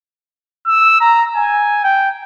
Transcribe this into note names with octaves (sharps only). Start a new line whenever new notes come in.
E6
A#5
G#5
G5